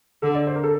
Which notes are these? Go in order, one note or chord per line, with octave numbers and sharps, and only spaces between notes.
D3 A4
D5
C5
A#4
A4